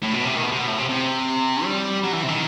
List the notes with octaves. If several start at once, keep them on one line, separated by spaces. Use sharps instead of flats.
A2
B2
C3
D#3
B2
C3
B2
A2
C3
C3
G3
F#3
E3
C3
D#3